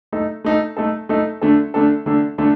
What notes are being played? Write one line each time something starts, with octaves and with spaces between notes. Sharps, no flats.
A3 D#4 A4
A3 D#4 A4
A3 D#4 A4
A3 D#4 A4
D3 A3 D4 A4
D3 A3 D4 A4
D3 A3 D4 A4
D3 A3 D4 A4